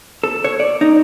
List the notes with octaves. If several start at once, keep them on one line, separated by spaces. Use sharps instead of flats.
A4
C#5
D5
D#4